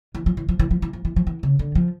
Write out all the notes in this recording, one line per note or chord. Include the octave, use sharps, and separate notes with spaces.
E3
F3
E3
F3
E3
F3
E3
F3
E3
F3
E3
C#3
D3
F3